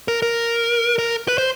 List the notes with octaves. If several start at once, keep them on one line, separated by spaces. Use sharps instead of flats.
A#4
A#4
A#4
B4
C5